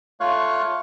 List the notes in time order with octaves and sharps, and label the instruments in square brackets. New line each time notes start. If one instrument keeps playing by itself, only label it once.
[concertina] A3 F4 C#5 F5 C#6 F#6